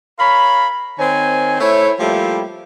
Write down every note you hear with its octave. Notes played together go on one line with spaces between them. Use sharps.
A#4 C#5 F5 B5
D#3 C4 C5 C#5 G#5
A3 E4 C5 C#5
F3 G3 A3 A#3 E4 G4